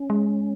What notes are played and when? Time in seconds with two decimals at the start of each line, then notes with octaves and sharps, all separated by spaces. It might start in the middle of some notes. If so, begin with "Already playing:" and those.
Already playing: C#4
0.10 G#3